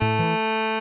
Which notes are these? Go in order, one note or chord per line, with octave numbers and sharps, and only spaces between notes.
A2 A3
E3